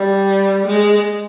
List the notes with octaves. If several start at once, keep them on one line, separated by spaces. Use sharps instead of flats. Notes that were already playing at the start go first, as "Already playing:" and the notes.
Already playing: G3
G#3